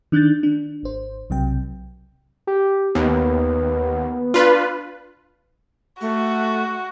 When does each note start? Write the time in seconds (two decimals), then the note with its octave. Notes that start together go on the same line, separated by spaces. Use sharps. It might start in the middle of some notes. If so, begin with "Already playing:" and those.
0.12 D#3 D4 F#6 G6 A6
0.43 D4
0.83 G#1 C5
1.30 B1 C3 F#3 G5
2.47 G4
2.95 D#2 B3
4.34 D4 F4 B4
6.01 A3 F#4